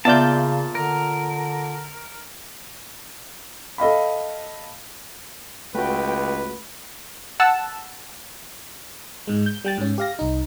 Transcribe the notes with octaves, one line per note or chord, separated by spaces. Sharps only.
A#2 C#3 B3 F4 D5 E5 A5 G6
D3 A#4
A4 D#5 F5 B5
C#2 A3 F#4 B4 G5
F#5 A5 E6
G#2 G#3
G6
G3 G5 A6
G#2 C#4
G4 F5 A#6
C2 D#4